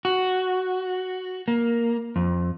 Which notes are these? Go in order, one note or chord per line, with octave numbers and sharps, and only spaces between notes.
F#4
A#3
F2